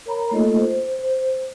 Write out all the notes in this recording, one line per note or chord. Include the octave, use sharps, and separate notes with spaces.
A#4 C#5 A#5 B5
A3 A#3 D#4 F4 A4 D#5
C5
C5